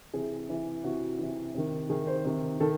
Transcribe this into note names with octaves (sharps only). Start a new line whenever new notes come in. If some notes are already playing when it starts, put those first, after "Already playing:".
C3 E3 G#4
C3 E3
C3 E3 F#4
C3 E3
C3 D#3
C3 D#3 G#4
C5
C3 D#3
D#3 A4